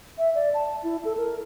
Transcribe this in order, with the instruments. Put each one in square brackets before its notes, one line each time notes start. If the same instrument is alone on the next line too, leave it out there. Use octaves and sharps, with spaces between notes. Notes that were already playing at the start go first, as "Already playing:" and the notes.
[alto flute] E5
D5
A5
E4
A4
A#4